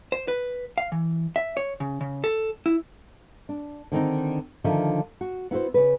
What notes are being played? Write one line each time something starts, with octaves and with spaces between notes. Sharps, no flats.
C5
B4
F5
E3
E5
C#5
C#3
C#3
A4
E4
D4
D3 D#3 C4 D#4
D3 D#3 F3 E5
F#4
B3 E4 F#4 C5
C#3 B4